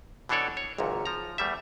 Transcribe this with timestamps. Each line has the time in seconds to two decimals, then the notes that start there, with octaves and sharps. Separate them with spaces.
0.29 B2 E3 D4 A4 C#5 D5
0.57 C#5
0.78 G#1 C#2 F#2 A#2
1.05 F3 A#5
1.38 E2 G3 A3 E5